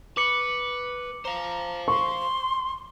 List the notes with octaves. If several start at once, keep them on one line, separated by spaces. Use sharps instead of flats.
B4 D6 C#7 F#7
C5 F5 A#5
C6 C#6